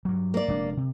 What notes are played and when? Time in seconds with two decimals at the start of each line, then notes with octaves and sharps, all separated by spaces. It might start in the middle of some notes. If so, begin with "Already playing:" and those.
0.05 G2 F#3
0.34 A#3 D5
0.48 F1 G#3 D4
0.77 C3